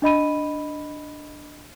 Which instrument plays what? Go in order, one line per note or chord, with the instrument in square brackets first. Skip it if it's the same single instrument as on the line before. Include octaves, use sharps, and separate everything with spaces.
[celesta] D4 D#5 B5 D#7